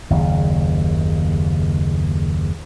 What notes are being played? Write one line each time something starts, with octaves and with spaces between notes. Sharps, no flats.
F#1 D#2 C#3